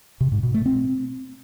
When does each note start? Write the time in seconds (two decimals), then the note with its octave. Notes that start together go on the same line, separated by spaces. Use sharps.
0.21 C3
0.32 G#2
0.43 B2
0.54 A3
0.66 C4